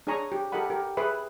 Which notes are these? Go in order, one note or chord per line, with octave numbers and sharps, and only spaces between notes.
D4 G#4 C#5 G#5 A#5 C#6
G4
G4 A4 A#4 D#5 F#5 B5
G4 A#4
G#4 B4 E5 B5